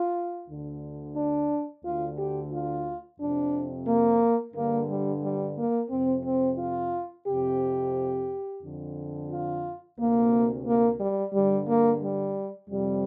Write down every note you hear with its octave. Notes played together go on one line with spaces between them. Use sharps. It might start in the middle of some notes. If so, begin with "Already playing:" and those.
Already playing: F4
D2 D3
D4
D2 D3 F4
G4
F4
F2 C3 D4
A#3
G2 D3 A#3
G3
G3
A#3
F2 C3 C4
C4
F4
F2 C3 G4
F2 D3
F4
D2 C3 A#3
A#3
G3
G2 D3 G3
A#3
G3
F2 C3 G3